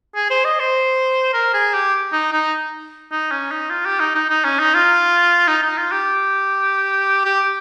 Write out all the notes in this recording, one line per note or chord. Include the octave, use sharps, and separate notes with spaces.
G#4
C5
D#5
C5
A#4
G#4
G4
D#4
D#4
D#4
C#4
D#4
F4
G4
D#4
D#4
D#4
C#4
D#4
F4
D#4
D#4
F4
G4
G4